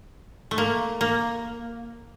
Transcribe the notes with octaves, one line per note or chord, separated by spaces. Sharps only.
A3
A#3
A#3